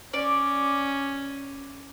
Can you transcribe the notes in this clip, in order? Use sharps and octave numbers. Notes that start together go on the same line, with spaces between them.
C#4 D5